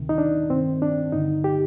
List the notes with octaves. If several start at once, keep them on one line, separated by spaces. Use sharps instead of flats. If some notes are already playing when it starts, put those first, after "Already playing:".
Already playing: D2 C3 D#3
D#4
D4
G2 D#3 C4
D4
G2 D3 D#4
G4